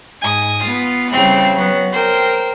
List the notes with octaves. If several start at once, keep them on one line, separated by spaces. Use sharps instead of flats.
G#2 G#5 D#6
B3 F4
C#3 E3 G3 C4
F#3 B3
A#4 C5 G5